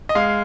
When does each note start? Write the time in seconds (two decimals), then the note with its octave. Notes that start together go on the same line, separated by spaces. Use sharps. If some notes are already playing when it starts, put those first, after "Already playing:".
0.09 D#5
0.15 G#3 F5